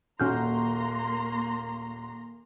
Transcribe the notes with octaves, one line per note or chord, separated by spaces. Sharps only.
D#1 A#3 C#4 F#4 A#5 C6 F6 G6